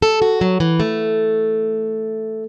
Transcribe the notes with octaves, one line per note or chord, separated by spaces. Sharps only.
A4
F#4
F#3
E3
A3